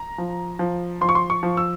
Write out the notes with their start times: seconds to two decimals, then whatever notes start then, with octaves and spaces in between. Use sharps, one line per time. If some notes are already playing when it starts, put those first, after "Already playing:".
Already playing: A#5
0.18 F3
0.59 F3
1.01 F3 C6
1.09 C#6
1.15 C6
1.30 C#6
1.43 F3
1.57 E6